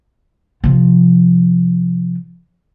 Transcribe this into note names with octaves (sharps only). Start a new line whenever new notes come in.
C3 F3